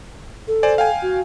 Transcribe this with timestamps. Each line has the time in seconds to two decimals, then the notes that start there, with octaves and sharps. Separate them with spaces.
0.48 A4
0.63 C5 D5 G#5
0.78 F5 G5 G#5
1.02 F#4